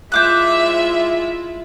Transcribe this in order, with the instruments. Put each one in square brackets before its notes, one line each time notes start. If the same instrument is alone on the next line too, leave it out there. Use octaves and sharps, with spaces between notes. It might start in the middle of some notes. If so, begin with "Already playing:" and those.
[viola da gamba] G#3 E4 F4 [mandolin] C5 D6 F#6 [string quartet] E5